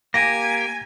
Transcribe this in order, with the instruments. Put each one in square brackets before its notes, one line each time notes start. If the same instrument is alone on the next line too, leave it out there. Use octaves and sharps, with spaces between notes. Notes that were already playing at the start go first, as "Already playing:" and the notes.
[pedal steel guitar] A#3 G4 [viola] G#5 [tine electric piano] A#6